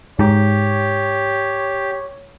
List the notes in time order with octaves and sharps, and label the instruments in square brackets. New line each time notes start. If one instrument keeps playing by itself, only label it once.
[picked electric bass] G#2 [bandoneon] G4 [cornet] C#5